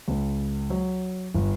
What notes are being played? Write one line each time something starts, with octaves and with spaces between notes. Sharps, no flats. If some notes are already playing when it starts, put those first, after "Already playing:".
C#2
F#3
G1